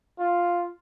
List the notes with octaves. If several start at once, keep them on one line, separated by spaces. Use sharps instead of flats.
F4